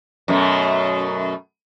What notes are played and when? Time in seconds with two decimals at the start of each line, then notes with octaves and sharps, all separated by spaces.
0.28 F#2 B2 A3